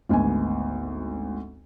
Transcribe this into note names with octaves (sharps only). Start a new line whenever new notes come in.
G#1 D2 B3 G#5